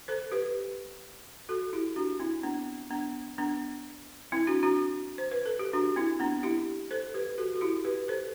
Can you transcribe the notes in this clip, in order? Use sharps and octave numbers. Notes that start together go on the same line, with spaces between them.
A4 C5
G4 B4
F#4 A4
E4 G4
D4 F#4
C4 E4
B3 D4
B3 D4
B3 D4
C4 E4
D4 F#4
D4 F#4
C5
B4
A4
G4
D4 F#4
C4 E4
B3 D4
E4 G4
A4 C5
G4 B4
F#4 A4
F#4
E4 G4
G4 B4
A4 C5